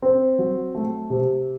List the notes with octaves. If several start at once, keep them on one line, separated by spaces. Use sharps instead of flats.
C4
F#3
A3
C3